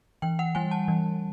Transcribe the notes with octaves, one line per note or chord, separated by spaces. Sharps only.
E3 G5
F#5
G3 G#5
A5
E3